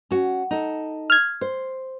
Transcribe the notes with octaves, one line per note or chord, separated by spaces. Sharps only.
C#4 F#4
D#4 A4
F6 G#6
C5